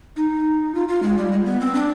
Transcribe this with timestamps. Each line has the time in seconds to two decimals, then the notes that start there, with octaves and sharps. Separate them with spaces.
0.17 D#4
0.75 F4
0.89 F4
1.03 G#3
1.17 G3
1.32 G#3
1.46 B3
1.60 C4
1.75 D4